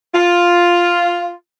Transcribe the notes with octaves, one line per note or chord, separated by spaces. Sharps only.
F4